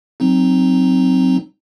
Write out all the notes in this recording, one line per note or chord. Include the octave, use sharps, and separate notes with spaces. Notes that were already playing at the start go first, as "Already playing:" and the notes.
F#3 C4 D#4